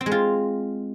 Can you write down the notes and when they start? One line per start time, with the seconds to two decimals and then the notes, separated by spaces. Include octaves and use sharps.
0.01 C4
0.06 G#3
0.12 F4